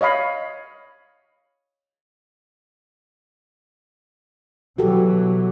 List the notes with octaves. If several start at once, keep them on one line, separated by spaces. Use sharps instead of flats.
C#5 D#5 F5 B5
B2 E3 F#3 F#4 G4 A4